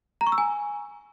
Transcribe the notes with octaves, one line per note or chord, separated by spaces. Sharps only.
A#5
C#6
E6
G#5